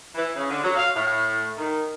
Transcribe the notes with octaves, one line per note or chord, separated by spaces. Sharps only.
E3
C#3
D3
F#3
F5
A2
D#3